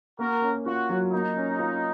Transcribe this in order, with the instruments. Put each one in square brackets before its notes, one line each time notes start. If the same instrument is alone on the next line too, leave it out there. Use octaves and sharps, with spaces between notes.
[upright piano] A#3 [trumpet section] F#4 A#4
[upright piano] C#4
[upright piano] F4 [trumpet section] F#4
[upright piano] F#3
[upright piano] A#3 [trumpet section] D#4
[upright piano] C#4
F4